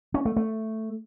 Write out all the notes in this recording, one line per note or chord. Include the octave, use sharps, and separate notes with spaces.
C#4
A3
A3